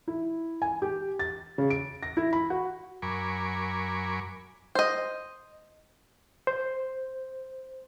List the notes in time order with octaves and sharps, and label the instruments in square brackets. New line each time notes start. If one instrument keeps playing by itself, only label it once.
[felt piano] E4
G#5
G4
A6
C#3
D7
A#6
E4
B5
F#4
[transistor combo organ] F#2 A#4 G#5 B5 C#6 D6
[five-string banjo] C5 D#5
[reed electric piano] C5